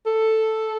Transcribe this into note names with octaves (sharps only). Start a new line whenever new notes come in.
A4